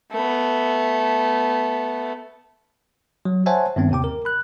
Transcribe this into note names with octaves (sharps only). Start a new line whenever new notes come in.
A3 B3
F#3
C5 C#5 E5 F#5 G#5 A5
G2 D#3 B3 C4
D#2 C3 G5 D6
A#4
B5 F#6